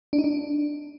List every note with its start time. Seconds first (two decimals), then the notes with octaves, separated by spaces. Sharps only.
0.13 D4
0.19 D#4
0.24 D4